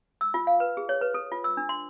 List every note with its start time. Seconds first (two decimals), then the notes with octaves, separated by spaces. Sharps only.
0.21 E6
0.34 F4
0.47 F5
0.60 B4
0.77 G#4
0.89 C#5
1.01 B4
1.14 A4
1.32 F4
1.44 E6
1.57 D4
1.69 C6